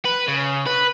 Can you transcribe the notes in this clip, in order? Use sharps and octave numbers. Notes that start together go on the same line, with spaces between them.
B4
C#3
B4